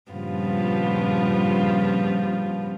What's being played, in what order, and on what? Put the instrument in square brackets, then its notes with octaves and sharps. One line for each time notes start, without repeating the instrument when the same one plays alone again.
[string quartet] G2 A#2 C#3 F3 B3 F4